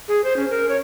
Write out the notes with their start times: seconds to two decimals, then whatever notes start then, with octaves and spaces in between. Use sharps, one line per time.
0.08 G#4
0.24 C5
0.36 C#4
0.50 A#4
0.69 C#5